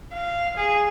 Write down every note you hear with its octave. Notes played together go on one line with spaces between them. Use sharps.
F5
G#4